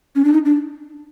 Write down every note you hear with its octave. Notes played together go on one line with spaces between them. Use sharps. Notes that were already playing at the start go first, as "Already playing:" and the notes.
C#4
D4
D#4
D4